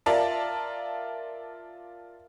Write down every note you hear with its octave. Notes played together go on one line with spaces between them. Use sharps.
F4 A#4 D5 E5 A5